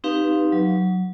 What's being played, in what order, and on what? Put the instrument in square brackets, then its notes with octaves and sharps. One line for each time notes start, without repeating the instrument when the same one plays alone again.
[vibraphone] C4 D#4 G4 B4 F5
F#3